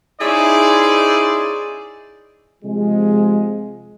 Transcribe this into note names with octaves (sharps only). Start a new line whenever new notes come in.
C#4 D#4 E4 G#4 C5 D5
C3 F3 G#3